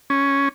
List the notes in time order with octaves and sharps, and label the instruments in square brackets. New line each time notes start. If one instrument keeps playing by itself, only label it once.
[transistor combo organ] C#4